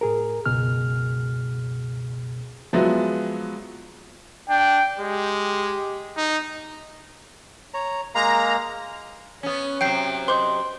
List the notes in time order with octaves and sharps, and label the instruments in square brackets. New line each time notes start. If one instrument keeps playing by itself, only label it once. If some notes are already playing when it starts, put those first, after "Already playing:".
[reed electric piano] A2 G#4 A#4
C#2 F#2 B2 G#4 F6
[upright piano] F3 F#3 G#3 B3 E4 F#4
[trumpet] D4 [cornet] G5
[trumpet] G#3 [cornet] G4
[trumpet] D#4
[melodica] C#5 A#5
[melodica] G#3 A#3 F5 [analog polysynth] A#5
[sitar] B3 C#4 [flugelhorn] C#5
[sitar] C3 F#3 [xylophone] G5 G6 C7 [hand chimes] D7
[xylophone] C5 D6 G6 [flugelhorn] D#5 [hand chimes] C6